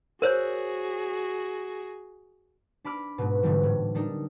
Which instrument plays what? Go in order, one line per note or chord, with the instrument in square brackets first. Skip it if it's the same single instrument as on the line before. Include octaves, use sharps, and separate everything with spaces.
[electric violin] F#4 G#4 [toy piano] A#4 C5 C#5
[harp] D4 B5 D6 F6 D7
G#2 B2
G#2 D3 E3 F#3 G3 C4
A2
G3 D4 D#4 A#4